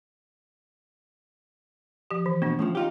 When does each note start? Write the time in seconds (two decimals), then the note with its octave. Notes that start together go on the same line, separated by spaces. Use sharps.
2.11 F3 G4
2.26 E3
2.42 B2 A#3 D4
2.59 A2 C#3 F3
2.75 D#4 F4 G4